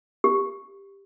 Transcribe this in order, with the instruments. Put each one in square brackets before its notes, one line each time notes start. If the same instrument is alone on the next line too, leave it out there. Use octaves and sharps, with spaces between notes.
[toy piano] G4